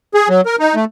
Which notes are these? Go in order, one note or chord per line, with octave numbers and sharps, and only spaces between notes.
G#4
F#3
A#4
D#4
A3